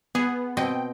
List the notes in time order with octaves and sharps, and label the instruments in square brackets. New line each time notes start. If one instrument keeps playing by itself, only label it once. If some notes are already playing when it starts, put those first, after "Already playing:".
[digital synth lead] B3 [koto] G#4
[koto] B2 C4 D#5 [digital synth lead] G5